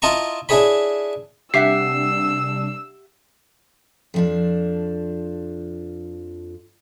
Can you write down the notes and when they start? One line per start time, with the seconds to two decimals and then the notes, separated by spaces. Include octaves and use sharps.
0.02 E4 F4 D#5 A5 A#5 C#6
0.49 D4 E4 G#4 C#5 B5
1.54 C3 G3 D4 G4 E5 F#5 E6 C7
4.14 F2 F3 D4